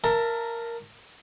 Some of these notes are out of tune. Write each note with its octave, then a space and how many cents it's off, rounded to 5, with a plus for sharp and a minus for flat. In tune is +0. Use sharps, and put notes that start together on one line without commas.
A#4 +0 E5 +25 A5 +15